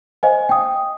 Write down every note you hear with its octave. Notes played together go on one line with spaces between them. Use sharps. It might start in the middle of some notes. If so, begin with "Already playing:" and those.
C5 D#5 F5 G#5
G5 D#6